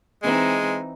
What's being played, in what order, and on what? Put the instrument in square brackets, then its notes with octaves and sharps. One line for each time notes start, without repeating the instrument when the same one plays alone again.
[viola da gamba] E3 C4 D#4 [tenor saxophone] G#3